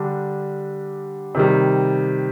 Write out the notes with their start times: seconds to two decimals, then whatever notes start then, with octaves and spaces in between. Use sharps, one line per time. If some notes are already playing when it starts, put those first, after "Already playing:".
Already playing: D3 G3 D4
1.35 C3 D#3 G3